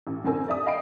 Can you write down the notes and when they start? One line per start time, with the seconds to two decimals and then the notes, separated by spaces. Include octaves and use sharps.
0.07 A1
0.24 F#2 D3 C4 A#4 G#5 E6
0.48 D5 E5 D#6
0.66 D#5 F5 G5 B5 C7 D7